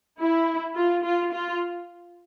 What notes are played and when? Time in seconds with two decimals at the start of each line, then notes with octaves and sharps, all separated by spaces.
0.19 E4
0.75 F4
1.03 F4
1.32 F4